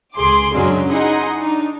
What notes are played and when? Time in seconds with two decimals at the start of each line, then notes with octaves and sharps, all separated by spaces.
0.14 C#2 G#4 C6 D6
0.54 F#2 C#3 F#3 G#3 C#4 D4
0.89 D#4 E4 G#4 D#5 F#5 C6
1.38 D4 D#4